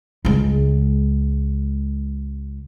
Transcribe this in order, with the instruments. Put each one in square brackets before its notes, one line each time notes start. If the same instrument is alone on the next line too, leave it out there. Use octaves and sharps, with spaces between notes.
[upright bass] C#2 G#3